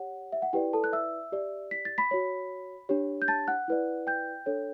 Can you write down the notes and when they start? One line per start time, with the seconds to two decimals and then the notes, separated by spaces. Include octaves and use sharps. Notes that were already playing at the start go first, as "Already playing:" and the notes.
Already playing: G4 C#5 F#5
0.32 E5
0.42 F#5
0.53 E4 G4 B4 D5 G5
0.73 A4 A5
0.84 F#6
0.93 E5 E6
1.32 G4 D5
1.71 B6
1.85 A6
1.98 B5 B6
2.11 F#4 C#5
2.89 D4 G4 C#5
3.22 G6
3.28 A5 A6
3.48 F#5 F#6
3.68 E4 B4 D5
4.07 G5 G6
4.46 D4 A4 C#5